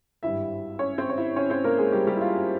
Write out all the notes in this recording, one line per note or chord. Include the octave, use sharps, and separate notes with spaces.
G#1 G2 G3 E4 E5
C#4 C#5
C4 C5
C#5
E4 E5
C#4 C#5
C4 C5
A#3 A#4
G#3 G#4
G3 G4
G3 G4
E4
F4